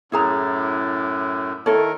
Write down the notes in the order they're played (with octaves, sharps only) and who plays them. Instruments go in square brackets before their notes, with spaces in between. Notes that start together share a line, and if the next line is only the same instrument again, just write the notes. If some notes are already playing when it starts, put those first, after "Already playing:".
[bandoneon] F#2 A2 [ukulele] E4 G#4 A#5
[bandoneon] D#3 A#4 [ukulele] E4 A4 C#5